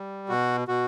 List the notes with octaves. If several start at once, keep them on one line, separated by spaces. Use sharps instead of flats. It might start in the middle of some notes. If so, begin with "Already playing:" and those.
Already playing: G3
B2 F#4
B2 F#4